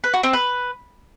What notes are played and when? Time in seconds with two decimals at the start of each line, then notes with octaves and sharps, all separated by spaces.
0.04 B4
0.14 F#4
0.23 C4
0.33 B4